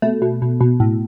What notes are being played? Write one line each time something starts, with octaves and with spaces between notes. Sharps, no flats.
B2 A3
B2
B2
B2
A2